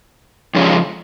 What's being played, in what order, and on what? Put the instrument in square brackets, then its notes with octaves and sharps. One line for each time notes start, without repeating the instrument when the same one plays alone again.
[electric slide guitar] F2 C#3 F3 G#3 C#4